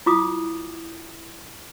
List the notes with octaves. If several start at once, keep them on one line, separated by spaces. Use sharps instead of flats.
E4 F4 D6 D#6